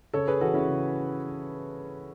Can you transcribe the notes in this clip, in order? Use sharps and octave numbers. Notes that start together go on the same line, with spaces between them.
C#3 A4 C#5
G#4 B4
E3 F#4 A4
C#4 E4
C#3